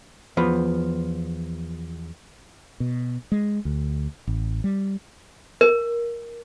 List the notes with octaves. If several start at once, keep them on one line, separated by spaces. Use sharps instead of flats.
E2 F3 B3
B2
G#3
D2
A1
G3
A#4